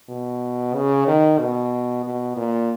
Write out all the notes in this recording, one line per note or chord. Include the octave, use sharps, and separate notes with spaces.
B2
C#3
D#3
B2
B2
A#2